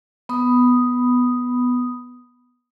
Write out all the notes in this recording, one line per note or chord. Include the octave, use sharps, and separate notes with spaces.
B3 B5 D#6